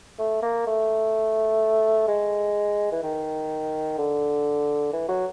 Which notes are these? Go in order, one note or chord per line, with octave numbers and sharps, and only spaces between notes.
A3
A#3
A3
G#3
E3
D#3
D3
E3
F#3